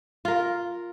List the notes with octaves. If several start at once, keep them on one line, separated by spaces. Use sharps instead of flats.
F4 A#4